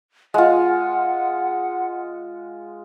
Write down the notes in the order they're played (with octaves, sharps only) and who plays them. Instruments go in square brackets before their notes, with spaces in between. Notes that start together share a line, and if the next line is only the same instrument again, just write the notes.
[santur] G#3 F4 [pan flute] F#5